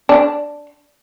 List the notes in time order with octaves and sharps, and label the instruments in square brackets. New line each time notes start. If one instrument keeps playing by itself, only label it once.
[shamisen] D4